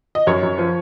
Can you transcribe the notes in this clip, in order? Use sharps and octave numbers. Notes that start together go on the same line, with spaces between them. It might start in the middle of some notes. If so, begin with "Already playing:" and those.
D#5
F#2 C#5
F#2
F3